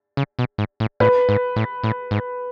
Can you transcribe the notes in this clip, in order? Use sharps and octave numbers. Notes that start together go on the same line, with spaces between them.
C#3
B2
G#2
A2
A2 B4
G#2
A2
A2
G#2